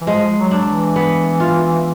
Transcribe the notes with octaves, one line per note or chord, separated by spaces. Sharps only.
E3
F3 G#3
F#3
D4
E3
B3
F4